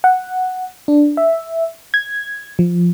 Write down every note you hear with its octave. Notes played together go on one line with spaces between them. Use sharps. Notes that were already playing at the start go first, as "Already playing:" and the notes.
F#5
D4
E5
G#6
F3